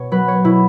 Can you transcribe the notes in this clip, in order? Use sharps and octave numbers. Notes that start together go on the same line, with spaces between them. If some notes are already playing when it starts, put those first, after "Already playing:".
Already playing: B2 C#5
F#3 B4
C#5
B2 E4